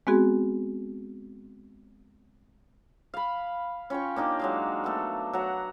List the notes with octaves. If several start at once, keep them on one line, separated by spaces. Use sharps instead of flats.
G#3 B3 C4 F#4 G#4
F5 B5
C#4 F4 G5 C#6
A#3 D4 D#4 G4
F#3 G#3 F5
A3 B3
F#3 F#5 A#5